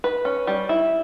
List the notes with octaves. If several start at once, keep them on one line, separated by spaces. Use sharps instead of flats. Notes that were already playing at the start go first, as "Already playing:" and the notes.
B4
C#4
G3
E4